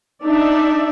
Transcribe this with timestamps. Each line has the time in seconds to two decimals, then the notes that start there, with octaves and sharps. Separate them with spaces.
0.23 D4 D#4 D5 E5